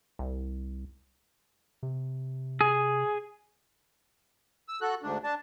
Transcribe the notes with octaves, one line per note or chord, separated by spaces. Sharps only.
C2
C3
G#4
E6
F#4 A4 F#6
D2 G#2 D4
D4 A5